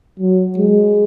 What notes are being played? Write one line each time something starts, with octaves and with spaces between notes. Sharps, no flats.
F#3
G#3